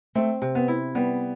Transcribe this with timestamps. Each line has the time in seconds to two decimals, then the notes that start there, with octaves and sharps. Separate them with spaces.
0.15 A3 C4
0.42 C3
0.55 B3
0.68 E4
0.95 G3 B3